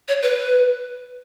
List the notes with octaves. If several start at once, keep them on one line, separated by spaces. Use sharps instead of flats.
C#5
B4